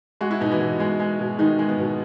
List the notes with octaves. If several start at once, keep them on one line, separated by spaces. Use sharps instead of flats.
G#3 F#4
E4
B2 D#4
E3 E4
B2
G#3
G#3
B2
D#3 G#3 D#4
G#3
B3
B2